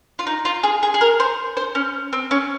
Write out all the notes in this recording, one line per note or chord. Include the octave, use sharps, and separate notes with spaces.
F4
D#4
F4
G#4
G#4
G#4
A#4
C5
C5
C#4
C4
C#4